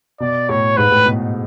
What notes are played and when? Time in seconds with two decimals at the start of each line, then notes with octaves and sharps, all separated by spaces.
0.20 B2 D5
0.49 A2 C#5
0.77 G#2 B4
0.92 A2
1.06 B2